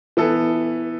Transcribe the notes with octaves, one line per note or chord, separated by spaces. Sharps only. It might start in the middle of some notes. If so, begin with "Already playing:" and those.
E3 B3 A4